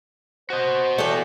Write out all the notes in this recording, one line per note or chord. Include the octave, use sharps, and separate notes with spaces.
F#4 C5 D#5
E2 A3 G4